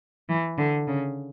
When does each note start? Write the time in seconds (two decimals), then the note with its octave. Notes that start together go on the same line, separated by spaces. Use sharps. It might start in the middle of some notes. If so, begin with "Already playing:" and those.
0.29 E3
0.58 D3
0.88 C#3